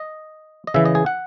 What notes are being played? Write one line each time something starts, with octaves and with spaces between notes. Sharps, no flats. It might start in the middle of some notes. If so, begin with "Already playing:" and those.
Already playing: D#5
D#5
C#3 E3 E5
D#5
G#4
F#5